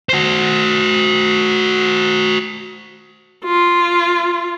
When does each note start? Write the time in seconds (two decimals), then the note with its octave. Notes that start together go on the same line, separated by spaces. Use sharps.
0.09 F#4 C5
3.44 F4